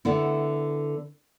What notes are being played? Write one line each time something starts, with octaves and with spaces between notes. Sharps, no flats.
D3 B3 E4